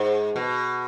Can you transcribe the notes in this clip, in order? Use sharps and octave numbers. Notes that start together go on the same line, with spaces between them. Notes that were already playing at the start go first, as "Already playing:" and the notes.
Already playing: G#2
B2